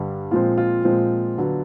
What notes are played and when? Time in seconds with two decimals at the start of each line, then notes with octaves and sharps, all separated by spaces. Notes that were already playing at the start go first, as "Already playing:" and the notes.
Already playing: G2 D3 G3
0.31 A#2 F3 G#3 C4 F4
0.57 F4
0.85 A#2 F3 G#3 C4
1.38 D3 F#3 B3